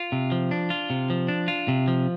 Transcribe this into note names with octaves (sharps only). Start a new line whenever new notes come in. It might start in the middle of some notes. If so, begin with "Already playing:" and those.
Already playing: F4
C3
F3
D4
F4
C3
F3
D4
F4
C3
F3